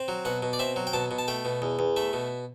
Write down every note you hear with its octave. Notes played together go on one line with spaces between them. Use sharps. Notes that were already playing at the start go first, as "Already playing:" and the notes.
Already playing: C4
F#3
B2 F#5
B2
D5
C4 E5
F#3
G5
B2 A5
B2
A5
A3 G5
B2
E2
E2
A3 E5
B2